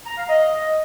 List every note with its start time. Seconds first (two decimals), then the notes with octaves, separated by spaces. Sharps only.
0.06 A#5
0.17 F5
0.29 D#5